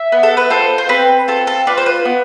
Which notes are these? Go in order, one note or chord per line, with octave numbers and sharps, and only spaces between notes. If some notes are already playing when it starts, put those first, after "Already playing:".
Already playing: E5
B3
A4
B4
F4 A4 C5
C5
C4 B4
F4 A4
A4
F4 B4 D5
C5
B4
B3